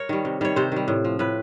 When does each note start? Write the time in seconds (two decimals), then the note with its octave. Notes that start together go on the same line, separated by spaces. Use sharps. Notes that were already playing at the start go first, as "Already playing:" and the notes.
Already playing: A#4 C#5
0.09 D#3 G3
0.25 C3
0.41 D#3 G3 C#5
0.56 C3 C5
0.72 D#3 G3
0.88 A2
1.04 F3
1.19 A2 B4